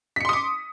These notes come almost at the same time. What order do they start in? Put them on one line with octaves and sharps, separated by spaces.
B6 C#7 C6 D#6 D6